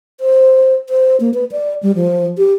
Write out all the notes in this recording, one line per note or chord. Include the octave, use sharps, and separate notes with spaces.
C5
C5
A#3
B4
D5
G3
F3
G4